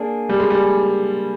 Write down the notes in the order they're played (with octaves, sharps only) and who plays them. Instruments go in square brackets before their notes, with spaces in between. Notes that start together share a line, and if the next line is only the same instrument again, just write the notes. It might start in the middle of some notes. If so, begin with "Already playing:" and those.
Already playing: [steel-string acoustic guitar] A#3 D4 G#4
[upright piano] G3
G#3
G3